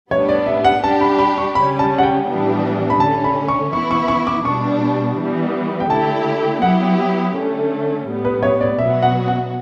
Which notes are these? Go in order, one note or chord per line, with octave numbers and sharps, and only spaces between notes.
A2 G3 B3 D4 C#5
D5
E5
F#5
G3 D4 G4 A5
B5
B5
C#6
C#3 G3 C#4 B5
A5
F#5
G5
A2 E3 G3 B3 D4
B5
D3 A3 C#4 A5
B5
C#6
E3 B3 E4 C#6
C#6
C#6
D6
B2 G3 B3 D4 C#6
E3 G3 B3
G5
D3 A3 E4 G4 A5
F#3 B3 E4 G4 F#5
D3 A3 C#4
A2 G3 B3
B4
C#5
D5
B2 F#3 B3 F#4 E5
F#5
F#5